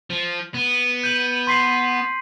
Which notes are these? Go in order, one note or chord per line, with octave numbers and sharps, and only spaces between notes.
F3
B3
G6 D#7 F#7
C6 B6 C7